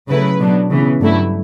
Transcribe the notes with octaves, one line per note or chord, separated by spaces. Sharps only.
C#3 F#3 A3 E4 B4
B2 F#3 B3 D4
C#3 E3 B3
G2 F#3 A3 E4